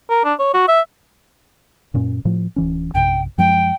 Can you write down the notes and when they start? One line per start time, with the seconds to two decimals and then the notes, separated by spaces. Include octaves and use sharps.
0.10 A#4
0.25 D4
0.39 C#5
0.54 F#4
0.68 E5
1.94 F#2 A#2 C#4
2.25 A2 F3
2.56 D1 E3 C#4
2.94 A#1 F#2 C3 G5
3.38 F#2 F3 G#3 G5